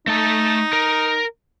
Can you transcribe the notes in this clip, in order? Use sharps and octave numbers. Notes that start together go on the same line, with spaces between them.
A3 D#4 A5
A#4